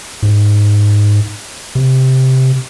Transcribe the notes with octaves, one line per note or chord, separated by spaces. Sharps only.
G#2
C3